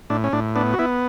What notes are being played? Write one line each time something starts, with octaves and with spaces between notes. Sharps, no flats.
A2 D4
C#4
A2 D4
B3 D4
F#4
B3 E4